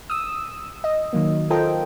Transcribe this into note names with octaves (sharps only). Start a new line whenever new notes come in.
D#6 E6
D#5
D#3 F#3 A#3
F4 A4 A#4 C5 D#5 G5